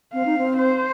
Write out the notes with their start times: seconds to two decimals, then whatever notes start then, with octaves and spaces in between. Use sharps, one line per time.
0.13 C4 F5
0.26 D#4
0.38 C4
0.58 C5